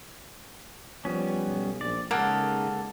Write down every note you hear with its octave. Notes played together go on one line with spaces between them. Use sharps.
F3 G3 B3 C#4
B1
A#1 D5
C#3 G#3 A#3 D#4 A4 A#4 F#5